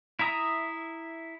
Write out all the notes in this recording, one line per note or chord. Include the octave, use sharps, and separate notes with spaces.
E4 E5 A#5 D#6